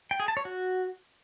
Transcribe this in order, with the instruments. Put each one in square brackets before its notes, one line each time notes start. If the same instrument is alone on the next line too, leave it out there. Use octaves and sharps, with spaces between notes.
[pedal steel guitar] G5
G#4
A5
C#5
F#4